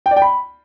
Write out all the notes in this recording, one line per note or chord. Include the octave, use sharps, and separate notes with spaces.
G5
D5
G5
B5